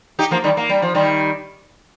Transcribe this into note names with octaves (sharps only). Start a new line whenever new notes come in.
D#4 G4
F3 A#3
D#3 G3
A#3
G3
F3
D#3 G3